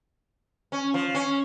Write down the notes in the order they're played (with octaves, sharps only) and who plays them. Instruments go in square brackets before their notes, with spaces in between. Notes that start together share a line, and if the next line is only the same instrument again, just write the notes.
[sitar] C#4
F3
C#4